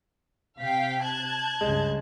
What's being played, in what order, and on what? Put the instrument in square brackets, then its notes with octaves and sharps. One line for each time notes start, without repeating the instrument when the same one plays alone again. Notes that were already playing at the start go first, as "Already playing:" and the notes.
[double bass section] C3 [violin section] F5 G5 B6
[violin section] A5 F#6 G#6
[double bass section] C#2 G2 C#3 [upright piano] G#3